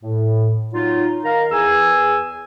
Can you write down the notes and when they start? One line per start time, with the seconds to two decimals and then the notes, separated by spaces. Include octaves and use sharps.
0.03 A2
0.74 F#3 D#4 F4
1.25 D#3 A#4 F5 A#5
1.52 E2 G#4 G#5 E6